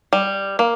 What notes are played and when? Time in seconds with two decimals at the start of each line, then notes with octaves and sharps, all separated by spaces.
0.13 G3
0.59 A#3